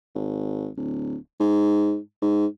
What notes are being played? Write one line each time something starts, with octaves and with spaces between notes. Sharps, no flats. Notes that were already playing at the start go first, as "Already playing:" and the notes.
G#1
D1
G#2
G#2